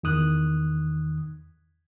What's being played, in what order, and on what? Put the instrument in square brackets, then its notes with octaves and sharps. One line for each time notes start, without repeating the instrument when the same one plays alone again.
[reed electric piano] E2 D#3 D#6 F#6